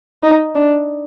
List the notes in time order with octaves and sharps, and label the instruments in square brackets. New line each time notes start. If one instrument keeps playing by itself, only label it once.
[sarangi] D#4
D4